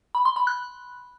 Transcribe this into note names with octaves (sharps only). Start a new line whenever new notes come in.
B5
C6
B5
F#6